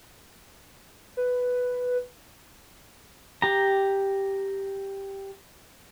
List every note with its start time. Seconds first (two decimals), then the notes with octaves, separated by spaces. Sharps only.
1.17 B4
3.42 G4 A#5